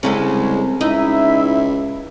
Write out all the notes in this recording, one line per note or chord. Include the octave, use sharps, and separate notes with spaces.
C2 C#3 G#3 A4
C#2 D#4 E4 E5